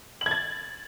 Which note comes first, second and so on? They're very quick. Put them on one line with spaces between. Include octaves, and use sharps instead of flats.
F#7 G#6 A6